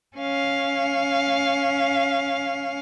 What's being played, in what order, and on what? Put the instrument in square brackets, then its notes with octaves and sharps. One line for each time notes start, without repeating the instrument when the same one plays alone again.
[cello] C#4 F5